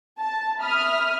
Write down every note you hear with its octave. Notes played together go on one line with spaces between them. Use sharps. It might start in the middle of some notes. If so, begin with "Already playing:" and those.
A5
E5 B5 D#6 F6